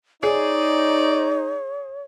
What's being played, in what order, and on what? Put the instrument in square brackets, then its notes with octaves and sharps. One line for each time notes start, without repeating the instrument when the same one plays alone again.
[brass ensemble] D#4 [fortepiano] G#4 [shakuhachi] C#5 [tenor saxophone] D5